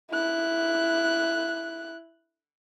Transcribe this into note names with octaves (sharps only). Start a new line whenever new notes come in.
E4 F#6